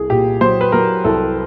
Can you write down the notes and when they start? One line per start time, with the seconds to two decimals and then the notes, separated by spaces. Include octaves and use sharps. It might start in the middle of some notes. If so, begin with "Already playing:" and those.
Already playing: C2 G#4
0.09 A#2 G4
0.41 F#3 C5
0.61 B4
0.72 F#3 A#4
1.04 C2 A4